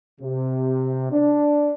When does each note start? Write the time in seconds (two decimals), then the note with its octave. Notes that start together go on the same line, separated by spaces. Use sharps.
0.21 C3
1.11 D4